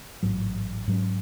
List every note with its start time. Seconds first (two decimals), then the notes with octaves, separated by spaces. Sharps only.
0.23 A1 G#2 F#3
0.87 G#2 F#3 C#4